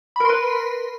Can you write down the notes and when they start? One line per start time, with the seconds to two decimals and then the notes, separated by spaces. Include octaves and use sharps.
0.16 B5
0.20 A#4
0.25 C6
0.29 B4